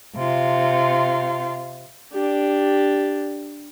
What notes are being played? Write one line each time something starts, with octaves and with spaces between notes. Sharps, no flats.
C3 F4
D4 G4